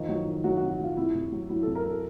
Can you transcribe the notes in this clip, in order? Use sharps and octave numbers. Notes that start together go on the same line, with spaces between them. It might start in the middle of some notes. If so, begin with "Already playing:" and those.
Already playing: D#3 F3
F#3
D#3
F#3 F#4
F#4
C3
F#4
F#3 F4
C3 E4
C3
F#3
F#3 E4
C3 A4
A#4
C3
A4